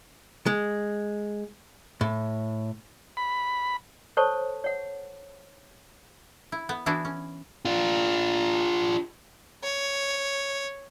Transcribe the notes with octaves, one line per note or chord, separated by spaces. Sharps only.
G#3
A2
B5
A4 C5 C#5 A5 C#6
C#5 F#5
E4
B3
E3 B3 D4 E4 F#4
C#4
D4 F4
C#5